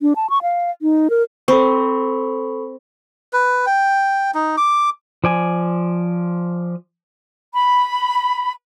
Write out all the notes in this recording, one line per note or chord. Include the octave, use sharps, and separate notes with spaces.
D4
A5
C#6
F5
D#4
A#4
C4 A4 B5 C#6
B4
G5
D#4
D6
F3 D5 G#5
B5